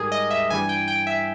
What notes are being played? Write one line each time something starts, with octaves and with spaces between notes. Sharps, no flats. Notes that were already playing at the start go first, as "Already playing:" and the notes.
Already playing: G#2 G3 G4 G#4 A#4
D#5
E5
G2 E3 G3 G#5
G5
G5
E5